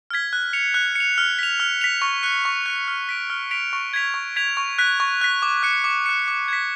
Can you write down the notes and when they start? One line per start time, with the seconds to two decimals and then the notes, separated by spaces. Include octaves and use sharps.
0.10 F6 G#6 B6
0.33 F#6
0.53 C#7 F7
0.74 F#6
0.95 C#7 F7
1.18 F6
1.39 B6 F7
1.60 F6
1.81 B6 F7
2.02 C#6
2.23 F#6 C#7
2.45 C#6
2.66 F#6 C#7
2.88 F6
3.09 B6 D7 F7
3.30 F6
3.51 B6 D7 F7
3.73 C#6
3.93 G#6 B6 F7
4.14 C#6
4.36 G#6 B6 F7
4.57 C#6
4.78 F#6 B6
5.00 C#6
5.21 F#6 B6
5.42 D6
5.63 F#6 C#7
5.84 D6
6.06 F#6 C#7
6.28 D6
6.48 G#6 B6